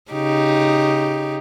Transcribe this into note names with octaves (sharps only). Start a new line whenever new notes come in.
C#3 D#4 G4